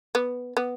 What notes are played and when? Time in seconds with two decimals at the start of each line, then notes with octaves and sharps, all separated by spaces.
0.15 B3
0.57 B3